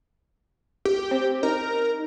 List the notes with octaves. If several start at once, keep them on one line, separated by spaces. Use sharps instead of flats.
G4
C4
D#4 A#4